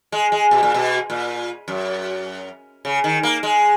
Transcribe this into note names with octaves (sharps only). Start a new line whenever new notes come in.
G#3
G#3
B2
A#2
B2
A#2
F#2
C#3
D#3
A#3
G#3